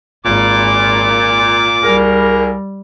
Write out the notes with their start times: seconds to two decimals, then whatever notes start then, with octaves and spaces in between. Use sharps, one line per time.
0.25 G#1 A#2 D6
1.83 C2 G3 G#4 A#4